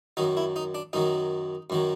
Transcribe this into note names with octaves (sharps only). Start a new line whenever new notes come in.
F#2 D#3 F#3 D#4
E4
D#4
D4
F#2 D#3 F#3 D#4
F#2 D#3 F#3